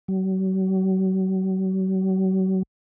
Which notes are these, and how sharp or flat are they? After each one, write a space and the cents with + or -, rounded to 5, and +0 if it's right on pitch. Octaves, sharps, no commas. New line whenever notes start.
F#3 +40